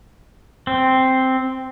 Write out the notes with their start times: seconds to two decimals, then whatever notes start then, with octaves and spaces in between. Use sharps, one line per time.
0.67 C4